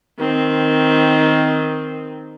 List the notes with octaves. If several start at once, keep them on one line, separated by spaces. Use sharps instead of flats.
D#3 C4